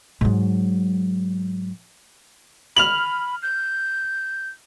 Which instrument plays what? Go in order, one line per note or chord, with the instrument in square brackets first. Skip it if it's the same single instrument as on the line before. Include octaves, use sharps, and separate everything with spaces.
[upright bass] G#2 F#3
[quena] B5 [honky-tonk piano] F6 F7 F#7
[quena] G6